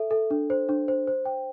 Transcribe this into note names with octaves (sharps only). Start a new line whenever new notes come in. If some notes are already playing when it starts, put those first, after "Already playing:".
Already playing: A4 E5
A4
D4
C5
D4
C5
C5
G5